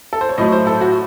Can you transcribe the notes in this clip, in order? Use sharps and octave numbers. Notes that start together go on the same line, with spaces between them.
A4
C5
C#5
A2 F#3 A3 D#5
C5
A4
F#4